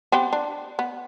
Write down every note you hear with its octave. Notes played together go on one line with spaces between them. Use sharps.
B3 C4 G4
D4
B3